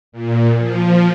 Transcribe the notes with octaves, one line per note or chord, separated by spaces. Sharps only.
A#2
F3